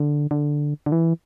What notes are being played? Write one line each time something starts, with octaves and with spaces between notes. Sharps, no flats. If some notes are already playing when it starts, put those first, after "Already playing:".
Already playing: D3
D3
D3
E3